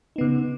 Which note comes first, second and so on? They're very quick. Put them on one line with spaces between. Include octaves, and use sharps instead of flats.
D#4 B3 C#3